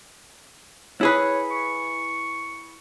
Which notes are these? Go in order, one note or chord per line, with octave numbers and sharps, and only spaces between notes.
E4 G#4 B4 C#5
C#6